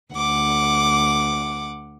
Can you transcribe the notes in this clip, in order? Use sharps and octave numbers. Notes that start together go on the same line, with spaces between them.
D2 F#5 D6